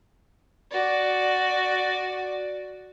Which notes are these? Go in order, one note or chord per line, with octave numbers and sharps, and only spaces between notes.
F#4 D5